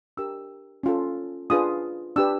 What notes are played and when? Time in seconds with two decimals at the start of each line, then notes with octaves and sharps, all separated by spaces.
0.17 D4 G4 A#4 E6
0.83 C#4 F4 A4
1.50 D4 F4 G#4 B4 D#6
2.16 D4 G4 B4 E6